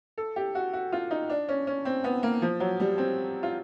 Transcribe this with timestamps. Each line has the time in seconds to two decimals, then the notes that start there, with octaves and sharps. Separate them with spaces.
0.18 A4
0.36 G4
0.55 F#4
0.73 F#4
0.92 F4
1.11 D#4
1.29 D4
1.49 C#4
1.67 C#4
1.85 C4
2.04 B3
2.23 A#3
2.42 F3
2.60 F#3
2.80 G3
2.98 C4
3.43 F4